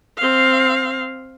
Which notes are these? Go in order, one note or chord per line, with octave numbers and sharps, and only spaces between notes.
C4 F5